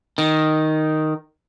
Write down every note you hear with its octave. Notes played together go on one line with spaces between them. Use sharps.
D#3